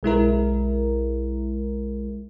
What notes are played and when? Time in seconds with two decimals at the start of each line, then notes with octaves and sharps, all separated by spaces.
0.03 B1 G#3 E4 A#4